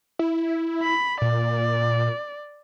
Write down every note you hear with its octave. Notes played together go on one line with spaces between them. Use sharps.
E4
B5
A#2 D5